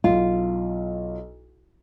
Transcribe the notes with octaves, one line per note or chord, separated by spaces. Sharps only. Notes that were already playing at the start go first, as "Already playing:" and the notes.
B1 F4